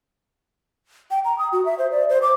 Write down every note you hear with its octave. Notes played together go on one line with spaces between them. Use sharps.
G5
A#5
D#6
F#4
E5
C5
D5
C5
D6